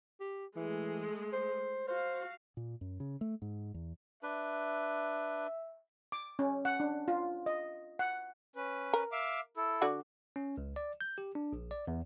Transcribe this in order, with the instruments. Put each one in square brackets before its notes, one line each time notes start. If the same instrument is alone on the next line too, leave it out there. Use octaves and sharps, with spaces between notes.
[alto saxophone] G4
[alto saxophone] E3 [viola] G#3 A3
[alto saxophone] C5
[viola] F#4 F5 [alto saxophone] C5
[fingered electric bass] A#2
F#2
C#3
A3
G#2
E2
[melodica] D4 B4 [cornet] E5
[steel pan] D6
C#4
F#5
D4
F4
D#5
F#5
[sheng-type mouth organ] C#4 B4
[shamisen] A#4
[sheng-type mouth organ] E5 F5 D6
E4 A4
[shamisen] D3 F#4 D5
[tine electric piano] C#4
C#2
D5
G6
G4
D4
A#1
D5
E2